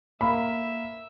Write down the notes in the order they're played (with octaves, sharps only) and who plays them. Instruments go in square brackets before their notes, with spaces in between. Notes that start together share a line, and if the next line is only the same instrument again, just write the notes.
[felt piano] A#3 [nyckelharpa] E5 [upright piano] B5